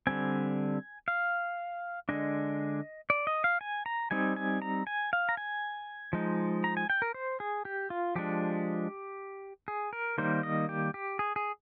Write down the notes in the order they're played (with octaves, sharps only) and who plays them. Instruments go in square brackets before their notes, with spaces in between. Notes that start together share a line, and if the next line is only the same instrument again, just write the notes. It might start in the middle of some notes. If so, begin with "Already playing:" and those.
[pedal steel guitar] D3 G3 C4 G#5
F5
D3 G#3 D4 D#5
D5
D#5
F5
G#5
A#5
G3 C4 D#4 G#5
G#5
A#5
G#5
F5
A#5
G#5
F3 G#3 D#4
A#5
G#5
G5
A#4
C5
G#4
G4
F4
F3 G#3 D4 G4
G#4
A#4
D#3 G3 A#3 D#4 C5
D#5
G4
G4
G#4
G#4